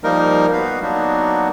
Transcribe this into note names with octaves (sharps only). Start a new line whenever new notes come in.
F3 G3 A#3 D#4 A#4
B3 F#4 B4 F5
F#3 A#3 B3 D4 D#4 F#4